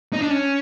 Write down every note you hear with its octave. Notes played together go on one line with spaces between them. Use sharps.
D#4
D4
C#4